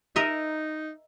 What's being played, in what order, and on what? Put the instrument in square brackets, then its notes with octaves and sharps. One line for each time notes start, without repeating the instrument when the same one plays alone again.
[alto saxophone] D#4 [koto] A#4 D#5 E5